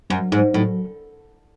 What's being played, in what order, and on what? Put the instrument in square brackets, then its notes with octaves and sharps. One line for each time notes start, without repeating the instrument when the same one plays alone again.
[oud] F#2 [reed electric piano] F#3
[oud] G#2 [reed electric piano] D#4
[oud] A2 [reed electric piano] F#3